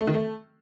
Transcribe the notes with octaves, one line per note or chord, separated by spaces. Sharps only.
A3
D#3
A3